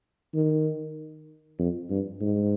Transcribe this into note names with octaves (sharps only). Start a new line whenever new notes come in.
D#3
F2
G2
G#2